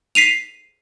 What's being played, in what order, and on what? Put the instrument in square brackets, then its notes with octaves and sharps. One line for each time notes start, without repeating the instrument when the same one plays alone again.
[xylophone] B6 C7 D#7 F7